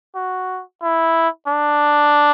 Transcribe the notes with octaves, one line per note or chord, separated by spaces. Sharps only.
F#4
E4
D4